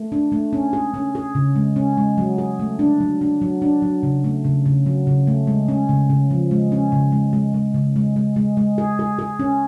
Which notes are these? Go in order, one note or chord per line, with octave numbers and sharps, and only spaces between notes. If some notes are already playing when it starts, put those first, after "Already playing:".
Already playing: A3
D4
A3
C#4
G#4
C#4
G#4
C#3
G#3
C#4
G#3
F#3
G#4
A3
D4
F#3
D4
F#3
D4
F#3
C#3
A3
C#3
C#3
F#3
C#3
A3
G#3
C#4
C#3
C#3
F3
G#3
C#4
C#3
G#3
G#3
G#3
C#3
G#3
G#3
G#3
G#3
G#4
G#4
G#4
C#4